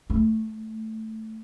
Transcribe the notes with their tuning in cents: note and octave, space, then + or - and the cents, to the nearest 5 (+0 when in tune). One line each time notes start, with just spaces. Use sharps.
A3 +0